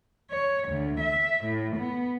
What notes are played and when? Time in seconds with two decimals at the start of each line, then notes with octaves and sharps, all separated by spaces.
0.30 C#5
0.68 D2
1.00 E5
1.44 A2
1.76 B3